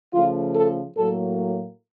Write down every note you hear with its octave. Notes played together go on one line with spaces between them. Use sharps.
C#3 F3 A3 F4
A4
A2 F#3 A#3 A4